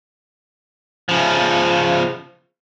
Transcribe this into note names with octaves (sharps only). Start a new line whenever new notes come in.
C#3 F3